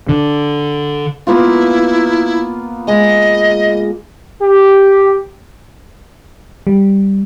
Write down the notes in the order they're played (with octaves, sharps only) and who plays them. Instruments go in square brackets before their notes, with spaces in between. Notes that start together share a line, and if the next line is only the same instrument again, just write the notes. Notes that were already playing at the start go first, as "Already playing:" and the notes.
[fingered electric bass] D3
[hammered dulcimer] A#3 B3 F4 [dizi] E4
[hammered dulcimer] G#3 [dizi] D#5
[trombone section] G4
[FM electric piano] G3